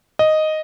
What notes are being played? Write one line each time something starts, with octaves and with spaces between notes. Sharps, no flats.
D#5